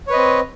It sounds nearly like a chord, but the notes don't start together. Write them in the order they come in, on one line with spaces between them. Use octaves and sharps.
C#5 B4 D#5 C4